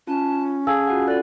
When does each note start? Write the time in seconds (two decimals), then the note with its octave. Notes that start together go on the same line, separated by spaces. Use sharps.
0.07 C#4 F4 A5
0.67 G#4 A4 F5 G#5 A5 E6 G#6
0.87 F4 F#4 F#5
1.08 F4 A4 D5 F#6